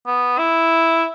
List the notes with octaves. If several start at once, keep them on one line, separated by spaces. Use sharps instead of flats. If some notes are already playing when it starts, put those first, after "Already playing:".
B3
E4